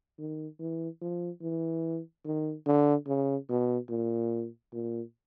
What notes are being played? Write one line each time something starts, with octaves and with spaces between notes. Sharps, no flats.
D#3
E3
F3
E3
D#3
D3
C#3
B2
A#2
A#2